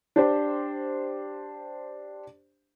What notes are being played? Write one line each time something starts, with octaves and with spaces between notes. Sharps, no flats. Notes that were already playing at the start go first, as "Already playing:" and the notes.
D4 G4 C5